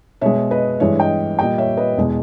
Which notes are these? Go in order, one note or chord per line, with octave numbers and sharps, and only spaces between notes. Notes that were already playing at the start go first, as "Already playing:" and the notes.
B2 G#3 C#5 E5
B4 D#5
G2 E3 G#3 C#5 E5
D#5 G5
A#2 G3 D#5 G5
C#5 E5
B4 D#5
E2 B2 G#3